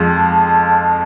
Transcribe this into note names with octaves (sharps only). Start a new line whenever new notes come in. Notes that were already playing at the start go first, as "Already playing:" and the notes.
Already playing: F2 F3 G#3